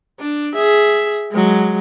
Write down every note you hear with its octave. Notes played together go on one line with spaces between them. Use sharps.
D4
G#4 E5
F#3 G#3